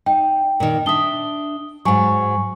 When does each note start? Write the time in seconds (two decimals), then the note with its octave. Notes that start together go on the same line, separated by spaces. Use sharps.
0.06 D#4 G5
0.60 A#2 D#3
0.86 D4 E5 D#6 G7
1.85 G#2 F#3 G#5 C#6